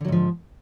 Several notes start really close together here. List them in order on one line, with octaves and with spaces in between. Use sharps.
D3 F#3 G#2 F3